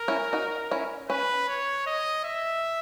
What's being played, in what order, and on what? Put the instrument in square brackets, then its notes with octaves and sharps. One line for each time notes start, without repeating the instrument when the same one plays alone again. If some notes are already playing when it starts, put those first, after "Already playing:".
Already playing: [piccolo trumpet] A#4
[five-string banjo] C#4 E4
D#4 F#4
C#4 E4
[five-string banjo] C#4 [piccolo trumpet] B4
[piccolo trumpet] C#5
D#5
E5